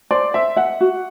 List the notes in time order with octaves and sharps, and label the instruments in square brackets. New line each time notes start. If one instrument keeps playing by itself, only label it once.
[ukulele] C5 [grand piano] D5
[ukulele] C5 [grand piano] E5
[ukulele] E5 [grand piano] F#5
[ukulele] F#4